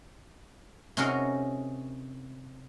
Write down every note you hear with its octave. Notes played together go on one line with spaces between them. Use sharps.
C3 C#4 D#4 F#4 G#4 A#4